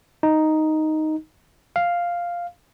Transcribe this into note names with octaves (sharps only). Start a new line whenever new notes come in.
D#4
F5